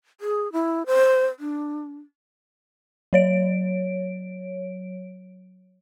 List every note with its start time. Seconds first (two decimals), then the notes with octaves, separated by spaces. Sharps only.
0.21 G#4
0.53 E4
0.86 C5
1.39 D4
3.13 F#3 C#5 D7